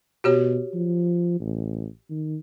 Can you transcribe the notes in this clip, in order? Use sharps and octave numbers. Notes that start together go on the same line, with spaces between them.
B2 F#4 G4 C#5
F3
A1
D#3